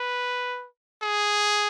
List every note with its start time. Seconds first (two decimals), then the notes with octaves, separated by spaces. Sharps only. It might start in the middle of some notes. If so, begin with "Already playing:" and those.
Already playing: B4
1.02 G#4